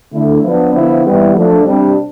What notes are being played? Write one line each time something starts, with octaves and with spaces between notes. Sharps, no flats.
D3 A3 E4
F3 B3 D4
D3 F3 B3 E4
E3 G3 B3 E4
F3 A3 D4
C3 G3 D4